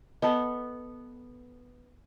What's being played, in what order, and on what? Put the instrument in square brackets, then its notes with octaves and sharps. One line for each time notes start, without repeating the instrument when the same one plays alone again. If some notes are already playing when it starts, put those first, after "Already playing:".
[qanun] B3 A4 [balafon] D#5 A5